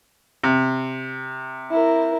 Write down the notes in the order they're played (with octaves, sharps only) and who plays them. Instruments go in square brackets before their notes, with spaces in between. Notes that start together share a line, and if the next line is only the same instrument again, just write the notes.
[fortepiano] C3
[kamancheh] E4 A#4